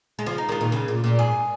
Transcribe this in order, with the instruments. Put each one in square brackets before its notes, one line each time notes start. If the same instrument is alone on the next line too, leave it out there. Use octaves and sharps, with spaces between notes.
[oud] G#3
[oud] C#3 F3 [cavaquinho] F4
[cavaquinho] D#4
[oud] D#3 G#3 [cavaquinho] F4
[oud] A#2 D#3
C#3
A#2
A#2
[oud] G#2 [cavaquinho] G#4